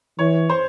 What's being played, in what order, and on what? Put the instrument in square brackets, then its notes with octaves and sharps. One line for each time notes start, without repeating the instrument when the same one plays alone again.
[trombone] E3 [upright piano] C#5
[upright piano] C5